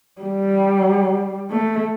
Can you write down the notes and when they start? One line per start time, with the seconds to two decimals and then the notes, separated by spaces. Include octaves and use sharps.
0.22 G3
1.51 A3